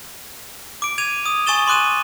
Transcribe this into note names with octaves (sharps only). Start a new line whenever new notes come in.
D6 D7
G#6 D#7 F7
D#6
G#5 C#6 D#6 A6 E7 G7
C6 D6 F#6 D#7 E7